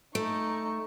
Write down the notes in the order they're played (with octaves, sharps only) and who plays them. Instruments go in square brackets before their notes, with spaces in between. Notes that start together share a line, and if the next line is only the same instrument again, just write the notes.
[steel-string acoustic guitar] A3 [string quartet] D#4 C#6